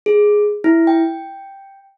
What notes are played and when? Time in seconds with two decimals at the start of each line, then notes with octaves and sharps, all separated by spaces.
0.06 G#4
0.64 E4
0.87 G5